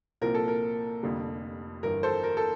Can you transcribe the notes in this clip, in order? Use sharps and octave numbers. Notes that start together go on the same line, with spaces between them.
C2 A#2 F3 C4 A#4
A4
A#4
F1 F2 D3 G3 A#3
G1 G2 E3 A#4
A4 C5
A#4
A4